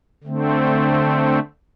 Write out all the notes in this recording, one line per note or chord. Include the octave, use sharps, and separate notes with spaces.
D3 A3 C4